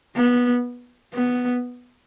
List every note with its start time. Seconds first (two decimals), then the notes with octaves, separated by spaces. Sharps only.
0.16 B3
1.14 B3